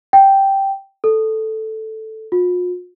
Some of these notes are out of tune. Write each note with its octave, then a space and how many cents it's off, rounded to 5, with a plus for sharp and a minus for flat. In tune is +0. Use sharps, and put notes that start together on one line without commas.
G5 -5
A4 +0
F4 +45